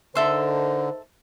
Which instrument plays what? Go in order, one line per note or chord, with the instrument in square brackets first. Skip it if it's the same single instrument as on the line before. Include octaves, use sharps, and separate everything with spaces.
[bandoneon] D3 [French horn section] D#4 A#4 C5 [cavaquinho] A4 E5 C6